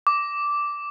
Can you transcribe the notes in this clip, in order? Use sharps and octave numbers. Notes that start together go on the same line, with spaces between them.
D6